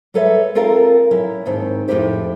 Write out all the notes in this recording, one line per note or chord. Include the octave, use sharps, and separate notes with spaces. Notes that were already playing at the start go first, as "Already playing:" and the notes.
F#3 G3 A4 B4 C#5 E5
C4 F4 A4 A#4 F5
F#3 C#4 E4
D#2 G#2 D#3 C4 A5
F2 A2 F#3 E4 G4 C5